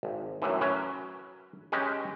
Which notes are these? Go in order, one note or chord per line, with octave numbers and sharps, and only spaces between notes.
G#1
F#2 A2 E3
F#3 C#4 B4
G#3 C#4 G4 B4 D#5